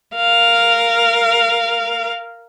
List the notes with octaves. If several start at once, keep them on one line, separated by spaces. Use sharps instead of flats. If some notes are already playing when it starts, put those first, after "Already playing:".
A#4 F5